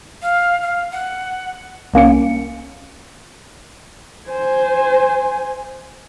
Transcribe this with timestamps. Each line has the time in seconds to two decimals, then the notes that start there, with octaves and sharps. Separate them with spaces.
0.22 F5
0.62 F5
0.91 F#5
1.94 C2 A#3 C#4 C#7
4.28 C5 G#5